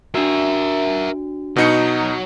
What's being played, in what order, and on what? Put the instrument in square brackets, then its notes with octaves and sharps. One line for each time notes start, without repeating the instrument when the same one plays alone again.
[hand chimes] D4 F#4 [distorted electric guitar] A#4 E5
[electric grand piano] B2 D#4 C#7 [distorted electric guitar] F#3